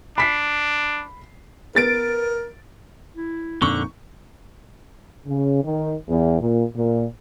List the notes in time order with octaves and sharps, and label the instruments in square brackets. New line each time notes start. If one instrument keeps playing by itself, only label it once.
[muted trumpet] D4 [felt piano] B5 B6 C7
[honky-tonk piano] B3 A6 D7 [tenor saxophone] A#4
[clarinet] E4
[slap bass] F2 A#2 C4 [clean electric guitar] D3 [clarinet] D#4 [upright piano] C#6
[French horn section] C#3
D#3
E2
A#2
A#2